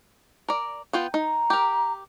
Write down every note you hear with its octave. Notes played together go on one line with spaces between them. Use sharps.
A#4 D5
B3 F4 G5
D#4 A#5
G4 A#4